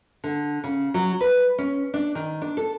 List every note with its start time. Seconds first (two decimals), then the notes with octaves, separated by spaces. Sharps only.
0.24 D3
0.64 C#3
0.94 F#3
1.21 B4
1.58 C#4
1.94 D4
2.15 D#3
2.42 D4
2.57 A4